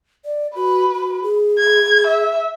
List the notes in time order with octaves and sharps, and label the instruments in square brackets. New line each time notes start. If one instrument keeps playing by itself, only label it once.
[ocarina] D5
[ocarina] F#4 [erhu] B4
[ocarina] F#4
G#4
[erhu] G#6
E5